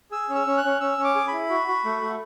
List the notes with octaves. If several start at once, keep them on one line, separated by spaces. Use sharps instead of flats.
G#4 E6
C#4
E6
C#4
F#6
C#4
C#4 E6
C#4
D6
G#4
B5
E4
F#4
F#4
A3
A3